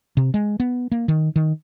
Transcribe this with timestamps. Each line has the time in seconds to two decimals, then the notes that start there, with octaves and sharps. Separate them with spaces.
0.17 C3
0.34 G#3
0.60 B3
0.92 A#3
1.08 D#3
1.36 D#3